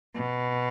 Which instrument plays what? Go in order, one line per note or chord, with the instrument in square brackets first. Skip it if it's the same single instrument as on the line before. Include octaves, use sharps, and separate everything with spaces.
[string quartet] B2